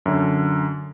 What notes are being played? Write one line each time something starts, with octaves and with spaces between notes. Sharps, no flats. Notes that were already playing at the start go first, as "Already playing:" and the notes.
F#2 D3